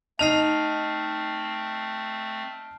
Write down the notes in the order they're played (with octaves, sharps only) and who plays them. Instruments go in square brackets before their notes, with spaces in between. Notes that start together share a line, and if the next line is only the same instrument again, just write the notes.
[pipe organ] A3 C4 [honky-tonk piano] D#4 F7 [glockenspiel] A5 F6 C7